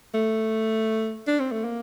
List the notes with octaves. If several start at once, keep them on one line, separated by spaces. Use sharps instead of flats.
A3
D4
C4
A3
A#3